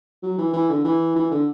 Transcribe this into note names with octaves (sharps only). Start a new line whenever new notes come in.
F#3
E3
E3
D3
E3
E3
D3